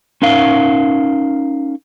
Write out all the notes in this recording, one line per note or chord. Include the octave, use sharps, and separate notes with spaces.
C#4 D#4 A#4 F5